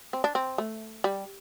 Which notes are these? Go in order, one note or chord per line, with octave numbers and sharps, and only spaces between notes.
C4
D4
C4
A3
G3